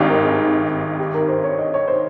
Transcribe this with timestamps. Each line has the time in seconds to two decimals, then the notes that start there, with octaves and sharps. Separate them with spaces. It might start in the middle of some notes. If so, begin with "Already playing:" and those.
Already playing: G#1 G2 D#3 G4 F5
0.10 A#4
0.23 G#4
0.99 G4
1.14 A#4
1.29 C5
1.44 C#5
1.59 D#5
1.74 C#5
1.88 C5